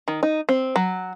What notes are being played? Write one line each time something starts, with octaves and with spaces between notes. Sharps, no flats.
D#3
D#4
C4
F#3